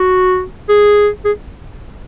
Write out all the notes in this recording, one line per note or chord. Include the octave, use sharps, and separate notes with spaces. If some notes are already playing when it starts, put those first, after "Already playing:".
Already playing: F#4
G#4
G#4